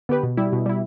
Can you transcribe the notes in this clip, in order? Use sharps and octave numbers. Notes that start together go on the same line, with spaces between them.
D3 B3 G4 B4
B2
G3 E4
B2
G3 E4